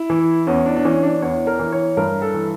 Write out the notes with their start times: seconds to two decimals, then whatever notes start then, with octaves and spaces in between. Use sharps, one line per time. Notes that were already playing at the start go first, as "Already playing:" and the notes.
Already playing: E4
0.10 E3
0.47 E2 C#4
0.66 D4
0.76 D4
0.85 E3 C#4
1.03 D4
1.22 E2 C#5
1.47 A#4
1.59 E3
1.72 C#5
1.97 G2 A#4
2.22 A4
2.34 E3